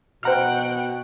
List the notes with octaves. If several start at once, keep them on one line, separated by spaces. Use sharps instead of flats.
B2 C5 F#5 G5 A#5 F6